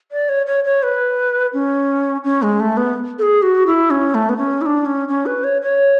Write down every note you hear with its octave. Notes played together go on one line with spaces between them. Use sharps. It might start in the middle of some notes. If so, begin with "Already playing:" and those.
D5
C#5
C#5
C#5
B4
C#4
C#4
G#3
A3
B3
A4
G#4
F#4
E4
C#4
A3
B3
C#4
E4
D4
C#4
C#4
B4
C#5
C#5